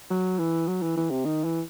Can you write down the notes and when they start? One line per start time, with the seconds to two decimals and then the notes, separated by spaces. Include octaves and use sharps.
0.10 F#3
0.39 E3
0.68 F#3
0.82 E3
0.97 E3
1.11 C3
1.25 D#3
1.45 E3